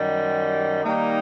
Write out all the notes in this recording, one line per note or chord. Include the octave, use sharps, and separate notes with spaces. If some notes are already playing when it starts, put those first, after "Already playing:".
Already playing: F#2 D#3 G3
D#3 G3 A#3 D#4